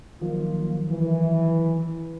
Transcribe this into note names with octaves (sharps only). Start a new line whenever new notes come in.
D#3 F3 F#3 A#3 F4
E3